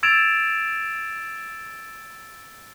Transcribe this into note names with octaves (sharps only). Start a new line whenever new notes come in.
E6 G#6 A6 D7 E7 F7